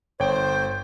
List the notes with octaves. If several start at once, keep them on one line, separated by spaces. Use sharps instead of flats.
G1 C5 C#5 G5